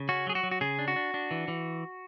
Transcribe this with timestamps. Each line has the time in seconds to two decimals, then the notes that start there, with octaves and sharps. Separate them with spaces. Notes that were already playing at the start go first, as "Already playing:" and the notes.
Already playing: C#3
0.09 C#4 F#4
0.27 F#3 G#4
0.35 F#4
0.43 F#3
0.51 F#4
0.61 C#3 G#4
0.79 D4
0.88 F#4
0.96 D4
1.14 D4
1.31 E3
1.48 E3